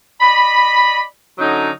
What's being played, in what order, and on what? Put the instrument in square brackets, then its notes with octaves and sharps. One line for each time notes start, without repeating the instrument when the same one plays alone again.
[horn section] D5 D#5 B5
D3 F#3 C#4 D#4